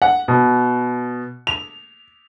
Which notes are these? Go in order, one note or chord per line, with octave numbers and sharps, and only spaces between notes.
F#5
B2
F7